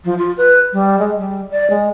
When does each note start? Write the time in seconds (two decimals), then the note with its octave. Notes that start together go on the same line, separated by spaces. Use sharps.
0.04 F3
0.18 F4
0.37 B4
0.73 G3
0.99 G#3
1.18 G3
1.51 D5
1.70 G#3